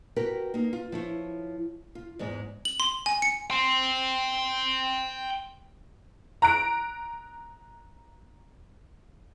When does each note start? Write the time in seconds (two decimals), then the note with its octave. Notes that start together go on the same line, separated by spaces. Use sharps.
0.16 F#4 G4 A#4 B4
0.54 A#3 D#4
0.73 F4
0.92 F3 E4 C#5
1.95 F4
2.19 E2 G#2 G#3
2.65 F#7
2.80 C6
3.06 G#5
3.22 C#7
3.50 G5 C6
6.42 A#5 F#6 D7